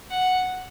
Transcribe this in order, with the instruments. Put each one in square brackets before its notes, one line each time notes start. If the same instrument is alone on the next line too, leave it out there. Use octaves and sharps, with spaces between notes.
[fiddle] F#5